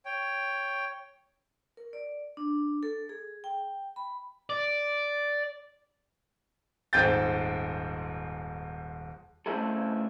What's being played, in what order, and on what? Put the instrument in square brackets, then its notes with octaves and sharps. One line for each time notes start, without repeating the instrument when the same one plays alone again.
[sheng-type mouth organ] C#5 G5
[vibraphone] A#4
D5
D4
A4
G#4
G5
B5
[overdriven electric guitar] D5
[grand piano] D#1 G#2 C4 G5 G6 A6
[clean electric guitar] C#3 A3 C4 E4 G#4 A4